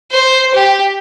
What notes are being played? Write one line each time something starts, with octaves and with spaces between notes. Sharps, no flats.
C5
G4